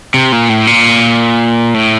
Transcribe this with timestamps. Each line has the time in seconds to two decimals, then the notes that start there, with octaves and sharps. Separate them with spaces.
0.14 C3
0.32 A#2
0.50 A2
0.67 A#2
1.74 A2